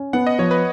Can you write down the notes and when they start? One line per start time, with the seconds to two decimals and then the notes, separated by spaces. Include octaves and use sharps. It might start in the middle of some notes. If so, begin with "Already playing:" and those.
Already playing: C#4
0.13 B3 F#5
0.27 D#5
0.39 F3 C#5
0.51 B4